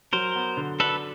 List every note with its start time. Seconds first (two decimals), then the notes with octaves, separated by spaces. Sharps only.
0.13 F#3 A#4 C5
0.35 B3
0.57 D3
0.80 D4 A4 B4